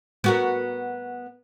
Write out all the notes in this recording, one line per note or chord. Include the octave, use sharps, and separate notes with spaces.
B3 F#4 A#4